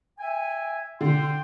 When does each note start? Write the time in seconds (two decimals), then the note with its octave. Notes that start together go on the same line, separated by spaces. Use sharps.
0.18 E5 G5 G#5
1.01 D3 G5 C6